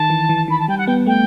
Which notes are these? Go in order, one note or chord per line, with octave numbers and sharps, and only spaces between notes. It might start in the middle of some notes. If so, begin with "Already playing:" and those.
Already playing: D#3 A5
E3
E3
D#3 B5
A5
G3 G5
F#5
B3 G5
A3 G5